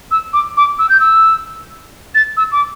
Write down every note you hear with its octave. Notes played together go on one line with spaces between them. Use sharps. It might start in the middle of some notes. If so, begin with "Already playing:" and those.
E6
D6
D6
E6
G6
E6
A6
E6
D6